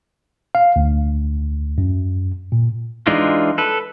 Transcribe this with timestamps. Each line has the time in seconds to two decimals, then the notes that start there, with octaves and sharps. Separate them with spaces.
0.55 F5
0.76 D2
1.78 F#2
2.52 A#2
3.07 E3 G#3 D4 D#4 F4
3.58 A4 B4